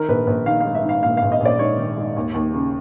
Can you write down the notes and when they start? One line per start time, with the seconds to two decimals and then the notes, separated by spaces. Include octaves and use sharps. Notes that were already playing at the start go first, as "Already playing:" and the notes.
Already playing: D#3 A#4
0.09 A#1 B4
0.27 A#1 B4
0.46 D#3 F5
0.61 G#2 F5
0.75 E5
0.84 D#3
0.89 F5
1.03 A#1 F5
1.17 A#1 F5
1.32 D#5
1.40 A#1
1.45 D5
1.59 G#2 C#5
1.78 D#3
1.98 G#2
2.16 D#2
2.34 D#2
2.54 C#3